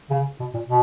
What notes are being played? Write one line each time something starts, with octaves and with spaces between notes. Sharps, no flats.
C#3
B2
A#2
B2